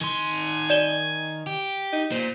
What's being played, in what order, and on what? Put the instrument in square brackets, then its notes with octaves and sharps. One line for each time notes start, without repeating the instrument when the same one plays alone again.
[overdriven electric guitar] D#3 C6 [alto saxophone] G#5
[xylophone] D5 E7 G7
[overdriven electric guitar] G4
[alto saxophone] D#4
[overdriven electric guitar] A#2 [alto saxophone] C5